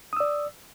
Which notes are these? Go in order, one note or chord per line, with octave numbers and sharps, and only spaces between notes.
D5 D#6 E6